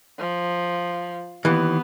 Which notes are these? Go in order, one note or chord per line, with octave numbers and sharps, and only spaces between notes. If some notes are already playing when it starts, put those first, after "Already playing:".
F3
D#2 E3 B3